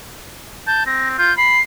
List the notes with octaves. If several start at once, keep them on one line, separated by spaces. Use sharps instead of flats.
A5 G6
C4 A#6
F4 G6
B5 C7